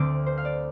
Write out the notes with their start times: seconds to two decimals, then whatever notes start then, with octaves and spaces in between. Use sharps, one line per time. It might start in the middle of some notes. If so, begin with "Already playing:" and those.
Already playing: D2 D3 A3 C4 D6
0.26 C5
0.38 F5
0.45 D5